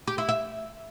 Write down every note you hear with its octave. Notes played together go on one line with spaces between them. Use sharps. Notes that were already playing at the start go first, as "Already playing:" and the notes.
G4
E4
E5